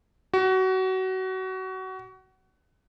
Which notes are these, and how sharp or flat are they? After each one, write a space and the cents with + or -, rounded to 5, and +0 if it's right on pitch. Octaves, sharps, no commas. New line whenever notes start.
F#4 +25